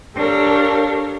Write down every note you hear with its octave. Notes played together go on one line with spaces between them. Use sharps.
D4 G4 A4 A#4 C#5 F5